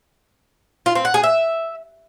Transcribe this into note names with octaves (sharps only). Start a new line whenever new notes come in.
F4
C4
F#5
G#4
E5